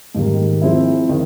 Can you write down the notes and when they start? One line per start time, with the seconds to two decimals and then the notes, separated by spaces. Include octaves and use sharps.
0.15 G#2 D#3 G3 A#3
0.62 F3 G#3 C4 E4
1.09 D#3